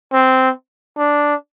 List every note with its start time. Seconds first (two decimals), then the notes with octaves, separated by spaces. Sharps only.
0.12 C4
0.97 D4